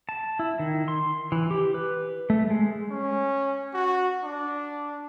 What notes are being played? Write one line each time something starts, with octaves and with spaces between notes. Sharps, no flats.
A5
E4
D#3
C6
E3
G4
B4
A3
G#3
C#4
F#4
D4